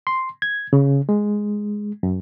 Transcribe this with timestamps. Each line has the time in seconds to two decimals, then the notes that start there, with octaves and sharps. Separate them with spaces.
0.07 C6
0.42 G#6
0.73 C#3
1.09 G#3
2.03 F#2